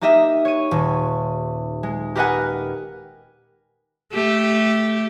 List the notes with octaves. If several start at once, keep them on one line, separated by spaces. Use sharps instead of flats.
A#3 D#4 G4 D#5 E5
C#5 D#7
D#1
G#3
G4 A#4 B4 D#5 F#5 G#5
A3 G4